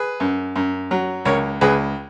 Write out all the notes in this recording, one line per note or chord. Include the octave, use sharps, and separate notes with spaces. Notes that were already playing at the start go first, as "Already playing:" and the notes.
Already playing: G#4 B4
F#2
F#2
F#3
C#2 A#4 C#5
C#2 G#4 B4